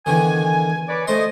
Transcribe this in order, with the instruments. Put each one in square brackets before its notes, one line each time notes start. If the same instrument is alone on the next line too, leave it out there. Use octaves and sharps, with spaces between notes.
[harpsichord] E2 D3 D#3 [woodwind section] G#5
[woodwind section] B4 C#5 D5
[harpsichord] A3 C5 C6 [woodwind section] D#5